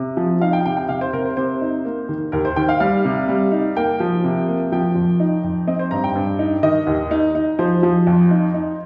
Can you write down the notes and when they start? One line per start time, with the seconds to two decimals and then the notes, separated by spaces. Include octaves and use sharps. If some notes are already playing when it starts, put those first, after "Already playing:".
Already playing: C3
0.17 F3
0.41 D#4 F5
0.53 G5
0.66 C3 G5
0.77 G5
0.89 C3 F5
1.01 C5
1.13 C3 A#4
1.25 C5
1.37 C3 C5
1.61 D#4
1.85 A#3
2.09 D#3
2.32 D#2 A#4
2.45 C5
2.56 D#3 G5
2.69 F5
2.80 G3 F5
3.05 C3
3.29 G3
3.52 D#4
3.76 A#3 G5
4.00 F3
4.24 C3
4.48 A#3
4.72 F3 G5
4.95 F2
5.20 D#4
5.44 F2
5.67 C4 D#5
5.79 C5
5.91 G2 A#5
6.04 G5
6.15 G2
6.39 D#4
6.63 D#3 D#5
6.87 D#2
7.11 D#4
7.35 D#4
7.59 F3 C5
7.83 F3
8.07 F2
8.31 D#4
8.54 D#4